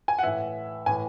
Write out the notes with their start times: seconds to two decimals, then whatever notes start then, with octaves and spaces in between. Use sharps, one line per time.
0.08 G#5
0.19 F#5
0.23 A2 E3 E5
0.86 A2 E3 G#5